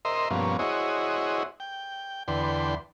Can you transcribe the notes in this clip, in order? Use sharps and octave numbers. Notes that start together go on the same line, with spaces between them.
A#4 C5 D#5 E5 C6
G2 B2 F3 A#3 C#4
E4 F#4 G#4 C5 C#5 D#5
G5
E2 D3 B4 G5 C6